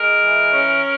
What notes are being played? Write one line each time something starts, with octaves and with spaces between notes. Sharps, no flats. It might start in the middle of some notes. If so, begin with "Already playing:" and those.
Already playing: G#3 A#4
E3
C#4